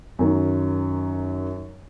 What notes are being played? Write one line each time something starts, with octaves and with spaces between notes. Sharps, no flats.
F#2 D#3